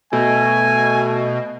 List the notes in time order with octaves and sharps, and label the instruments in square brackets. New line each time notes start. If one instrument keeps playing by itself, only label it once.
[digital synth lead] B2 [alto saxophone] A3 [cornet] G#5